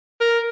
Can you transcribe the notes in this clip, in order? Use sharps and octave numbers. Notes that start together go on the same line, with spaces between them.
A#4